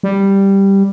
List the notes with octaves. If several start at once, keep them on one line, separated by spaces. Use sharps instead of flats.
G3